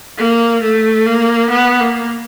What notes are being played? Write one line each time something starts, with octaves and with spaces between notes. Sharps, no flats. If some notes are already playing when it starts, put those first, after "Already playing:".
A#3
A3
A#3
B3
A#3